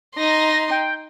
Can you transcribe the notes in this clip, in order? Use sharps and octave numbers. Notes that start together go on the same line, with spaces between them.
D#4 C6 A#6
G5